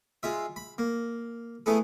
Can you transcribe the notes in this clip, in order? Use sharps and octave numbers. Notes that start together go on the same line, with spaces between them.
G#3 F4 E5
B5
A#3
A3 B3 E4 G#4 A4